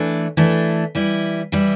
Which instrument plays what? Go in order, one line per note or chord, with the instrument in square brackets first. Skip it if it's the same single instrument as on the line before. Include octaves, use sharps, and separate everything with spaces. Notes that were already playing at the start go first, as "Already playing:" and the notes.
Already playing: [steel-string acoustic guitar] E3 A3 D4
E3 A3 D4
E3 G3 E4
E3 G3 E4